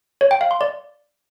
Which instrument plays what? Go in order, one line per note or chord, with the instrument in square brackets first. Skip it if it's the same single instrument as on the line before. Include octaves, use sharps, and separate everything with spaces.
[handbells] C#5
G5
F5
C6
D5